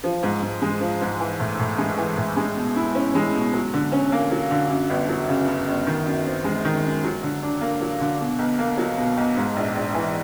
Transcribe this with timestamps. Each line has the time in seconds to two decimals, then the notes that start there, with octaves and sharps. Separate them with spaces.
0.04 F3
0.23 G#2
0.42 G#2
0.62 G#3
0.81 F3
1.01 G#2
1.20 E3
1.40 A2
1.59 A2
1.78 G#3
1.98 E3
2.17 A2
2.36 G#3
2.56 B2
2.76 E4
2.95 C#4
3.15 G#3
3.34 B2
3.53 F#3
3.73 D3
3.92 C#4
4.12 A#3
4.31 F#3
4.51 D3
4.70 F#2
4.90 G1
5.09 F#3
5.29 C#3
5.47 F#2
5.68 G1
5.86 D#3
6.06 F#2
6.25 C4
6.44 G#3
6.65 D#3
6.84 F#2
7.04 F#3
7.23 D3
7.43 D4
7.61 A#3
7.81 F#3
8.01 D3
8.20 B2
8.39 B1
8.58 A#3
8.78 F#3
8.98 B2
9.17 B1
9.37 G#2
9.56 A#1
9.75 A#1
9.94 E3